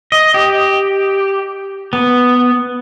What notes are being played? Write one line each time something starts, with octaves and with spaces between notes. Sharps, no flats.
D#5
G4
B3